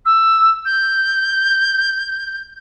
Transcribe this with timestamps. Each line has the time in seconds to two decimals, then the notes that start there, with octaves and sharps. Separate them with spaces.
0.05 E6
0.65 G6